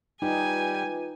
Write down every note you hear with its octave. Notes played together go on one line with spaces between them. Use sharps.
G3 D#4 F4 B4 G5 G#5